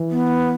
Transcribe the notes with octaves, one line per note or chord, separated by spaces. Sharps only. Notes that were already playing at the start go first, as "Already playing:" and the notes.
Already playing: E3
B3